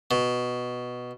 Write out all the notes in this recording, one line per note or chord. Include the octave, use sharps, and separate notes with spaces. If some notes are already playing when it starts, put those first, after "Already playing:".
B2